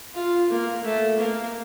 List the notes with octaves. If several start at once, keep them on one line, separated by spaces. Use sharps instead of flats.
F4
A#3
A3
A#3